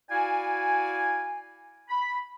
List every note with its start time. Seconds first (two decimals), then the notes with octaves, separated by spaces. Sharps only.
0.10 E4 F#4 D5 F5 G#5
1.89 B5